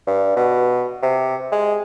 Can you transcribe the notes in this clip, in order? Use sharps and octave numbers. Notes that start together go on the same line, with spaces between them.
G2
B2
C3
G#3